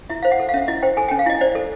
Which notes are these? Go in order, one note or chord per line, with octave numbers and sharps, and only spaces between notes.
E4 E5
C5 F5
F#5
A4
F5
C#4 E5
E4 D#5
C5 G5
A4 G#5
G5
C#4
F5
E4 D#5
C5 D5
A4